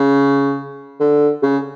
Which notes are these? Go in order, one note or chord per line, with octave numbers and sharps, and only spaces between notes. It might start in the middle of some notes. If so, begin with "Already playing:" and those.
Already playing: C#3
D3
C#3